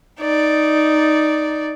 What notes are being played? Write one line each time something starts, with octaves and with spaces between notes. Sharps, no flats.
D#4 D5